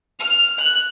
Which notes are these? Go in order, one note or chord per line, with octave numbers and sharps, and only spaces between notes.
F6
F#6